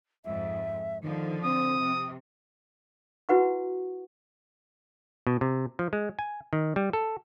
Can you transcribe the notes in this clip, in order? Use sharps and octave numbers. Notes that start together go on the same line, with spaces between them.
F2 G#2 E5
D3 D#3 F3
C4 D#6
C3
E4 F#4 B4 F#5 C#6
B2
C3
F3
G#3
G#5
D#3
G3
A4